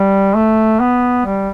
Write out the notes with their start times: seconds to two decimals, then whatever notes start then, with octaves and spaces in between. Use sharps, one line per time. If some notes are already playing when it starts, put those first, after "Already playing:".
Already playing: G3
0.34 A3
0.80 B3
1.26 G3